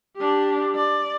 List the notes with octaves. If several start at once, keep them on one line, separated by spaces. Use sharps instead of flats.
D4 G4
D5